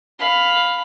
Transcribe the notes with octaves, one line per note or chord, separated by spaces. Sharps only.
F5 B5